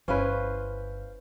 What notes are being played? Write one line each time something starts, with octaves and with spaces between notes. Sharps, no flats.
G1 C#4 E4 B4 C5 F5